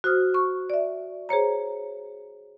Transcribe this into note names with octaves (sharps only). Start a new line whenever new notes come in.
F#4 C5 D#6 F6
C#6
D5 E5
G#4 C5 C#5 A#5